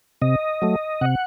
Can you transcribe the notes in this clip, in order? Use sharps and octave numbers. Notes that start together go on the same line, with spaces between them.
C3 D#5
F#3 A3
C3 F#5